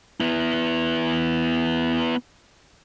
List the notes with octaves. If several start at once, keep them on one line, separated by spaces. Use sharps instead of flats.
B3 E4